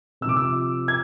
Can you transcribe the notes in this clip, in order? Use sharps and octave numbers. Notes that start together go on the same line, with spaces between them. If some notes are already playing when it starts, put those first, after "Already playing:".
C3 F3 D6 E6
E6
G#6